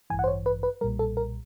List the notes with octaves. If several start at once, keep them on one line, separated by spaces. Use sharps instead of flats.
A1 G2 E3 G#5
F#5
C5
C#5
B4
B4
B1 A#2 G3 A#4
A4
A#4